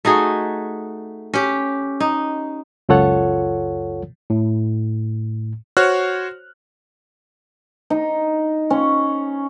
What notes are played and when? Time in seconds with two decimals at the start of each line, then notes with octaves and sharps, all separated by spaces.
0.05 A3 D#4 F#4 G#4
1.34 C#4 G4
2.00 D#4
2.89 C#2 F#2 F4 A4 C#5 F#5
4.30 A2
5.77 F#4 C5 C#5 F6 F#6
7.90 D#4
8.70 C#4